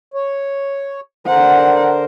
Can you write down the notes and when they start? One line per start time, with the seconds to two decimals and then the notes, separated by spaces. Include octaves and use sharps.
0.14 C#5
1.27 D3 A#4 C5 F#5